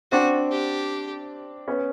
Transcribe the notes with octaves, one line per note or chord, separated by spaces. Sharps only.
C4 D4 F#4
G4
B3 C#4